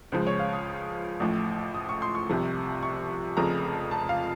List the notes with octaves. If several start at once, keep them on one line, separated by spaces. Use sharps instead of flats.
C#2 C#3 F3 C5
C#5
F5
D#6
A1 A2 F3
D#6
C#6
C6
C#6
C2 C3 F3
C#6
F1 F2 C#3 F3 A#5
A5
F5